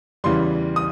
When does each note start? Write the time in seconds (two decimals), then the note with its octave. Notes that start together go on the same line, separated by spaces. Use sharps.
0.24 E2 C#3 E3 G3 C6
0.76 D#6